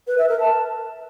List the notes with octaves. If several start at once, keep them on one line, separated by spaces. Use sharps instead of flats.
B4
E5
A#4
A5